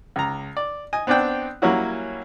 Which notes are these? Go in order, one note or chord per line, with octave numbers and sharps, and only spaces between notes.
C#2 A#5
D5
D#5 G#5
B3 C4 D4 D5 G5
F#3 G3 A#3 C#4 E4 F#4